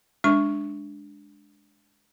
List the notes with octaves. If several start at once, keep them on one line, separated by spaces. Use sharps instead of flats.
G#3 D4 C#6